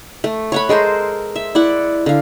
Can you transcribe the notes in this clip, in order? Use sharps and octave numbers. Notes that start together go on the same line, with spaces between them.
A3
C#5 F#5 B5
G#3 A4 A#4 C5
E5
E4 D5 F#5
D3 F5